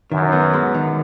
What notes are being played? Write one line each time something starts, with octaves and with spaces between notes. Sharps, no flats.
F#2 D#3
B3
G#3
D#3